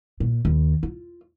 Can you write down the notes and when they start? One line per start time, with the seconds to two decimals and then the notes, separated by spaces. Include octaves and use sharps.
0.20 A#2
0.45 D#2
0.83 F4